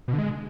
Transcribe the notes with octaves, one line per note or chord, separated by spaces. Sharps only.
B2
D3
G#3